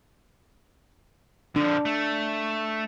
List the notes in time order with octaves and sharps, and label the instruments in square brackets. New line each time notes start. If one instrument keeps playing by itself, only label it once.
[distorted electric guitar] D3 F3 [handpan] D4
[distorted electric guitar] A3